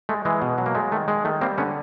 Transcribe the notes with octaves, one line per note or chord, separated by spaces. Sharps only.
G#3 A3
E3 G#3
B2
F#3
A#3
G#3 A3
D#3 A3
G#3
D#3 A3
G3 A#3 C4
D3 B3 C#4